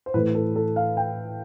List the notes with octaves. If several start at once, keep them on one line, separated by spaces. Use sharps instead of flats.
C5
A2 E3 A3 B4
A4
A4
F5
G5